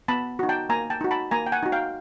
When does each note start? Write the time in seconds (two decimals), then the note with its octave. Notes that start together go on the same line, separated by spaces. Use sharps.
0.08 B3 A5 B5
0.39 D#4 F#4
0.49 G5 A5
0.69 A#3 G#5 A#5
0.90 G5 A5
1.01 D#4 F#4
1.11 A5 B5
1.31 A#3 G#5 A#5
1.47 G5
1.52 F#5 G#5
1.63 D#4 F#4
1.72 F5 G5